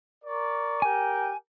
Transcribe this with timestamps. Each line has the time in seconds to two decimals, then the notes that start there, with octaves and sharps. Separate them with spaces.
0.24 A#4 D5 C#6
0.82 G4 A#4 G5 G#5